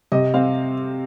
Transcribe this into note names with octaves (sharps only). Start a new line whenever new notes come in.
C3 D#5
C4 F5